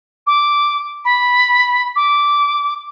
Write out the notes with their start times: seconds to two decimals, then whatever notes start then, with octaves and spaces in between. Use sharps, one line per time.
0.27 D6
1.04 B5
1.96 D6